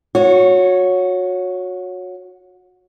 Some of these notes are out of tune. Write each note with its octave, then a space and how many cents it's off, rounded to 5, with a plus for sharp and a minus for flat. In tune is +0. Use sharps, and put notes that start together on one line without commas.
F#4 -25 C#5 +0